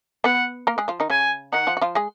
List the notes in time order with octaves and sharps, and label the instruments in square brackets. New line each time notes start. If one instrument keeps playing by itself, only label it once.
[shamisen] B3 B4 [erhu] F#5
[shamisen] A#3 A#4
G#3 G#4
F3 F4
D#3 D#4
[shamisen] C#3 C#4 [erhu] G#5
[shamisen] D#3 D#4 [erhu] F#5
[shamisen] F3 F4
F#4
F3 F4
G#3 G#4